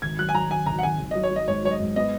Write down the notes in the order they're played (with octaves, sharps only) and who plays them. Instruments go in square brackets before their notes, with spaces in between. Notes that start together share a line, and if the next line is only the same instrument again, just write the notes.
[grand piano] G#1 [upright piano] G#6
[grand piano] F#3 [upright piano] F#6
[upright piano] G#5
[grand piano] F#3 [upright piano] A#5
[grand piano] G#1 [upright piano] G#5
[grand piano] G#1 [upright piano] A#5
[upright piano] F#5
[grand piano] G#1 [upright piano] G#5
[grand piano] G#1
[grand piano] F#3 [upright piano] D#5
[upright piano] C#5
[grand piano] F#3 [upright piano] D#5
[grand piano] G#2 [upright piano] C#5
[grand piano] F#3 [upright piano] C#5
[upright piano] D#5
[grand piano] G#2
[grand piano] B3 [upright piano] D#5